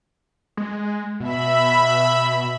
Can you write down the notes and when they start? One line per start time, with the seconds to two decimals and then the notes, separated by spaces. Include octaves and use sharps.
0.57 G#3
1.20 B2 E5 B5